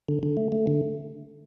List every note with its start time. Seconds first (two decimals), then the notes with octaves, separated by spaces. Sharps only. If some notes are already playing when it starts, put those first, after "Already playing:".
0.09 D3
0.23 D3
0.37 A3
0.52 A3
0.67 D3